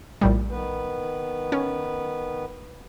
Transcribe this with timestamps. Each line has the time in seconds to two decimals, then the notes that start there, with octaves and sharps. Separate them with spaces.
0.21 A#1 A2 G3
0.51 D#3 B3 B4
1.52 C#4